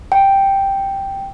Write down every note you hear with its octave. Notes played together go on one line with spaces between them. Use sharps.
G5